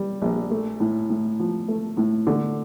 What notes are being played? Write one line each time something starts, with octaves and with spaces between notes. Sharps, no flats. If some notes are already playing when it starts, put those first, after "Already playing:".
Already playing: G3
A#1
A3
A2
A2
F3
A3
A2
D3